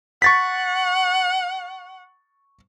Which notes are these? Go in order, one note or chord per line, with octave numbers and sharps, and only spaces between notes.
F#5 C#6 A6 B6